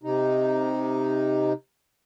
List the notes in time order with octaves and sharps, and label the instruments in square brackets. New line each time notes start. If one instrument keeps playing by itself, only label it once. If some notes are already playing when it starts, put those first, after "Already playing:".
[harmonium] C3 D#4